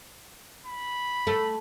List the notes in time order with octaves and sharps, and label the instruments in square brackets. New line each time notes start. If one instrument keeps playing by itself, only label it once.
[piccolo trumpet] B5
[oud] A3